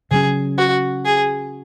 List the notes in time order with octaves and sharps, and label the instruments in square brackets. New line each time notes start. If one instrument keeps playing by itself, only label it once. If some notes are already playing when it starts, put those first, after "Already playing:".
[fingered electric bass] C#3 F#3 C#4 [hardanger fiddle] G#4
[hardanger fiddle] F#4
G#4